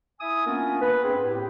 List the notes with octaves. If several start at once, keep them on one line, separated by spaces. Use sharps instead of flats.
E4 E5 G#5 D#6
A#3 B3 C#4 D4 F4 A#4
B4
G2 C4 G#4
A2 G4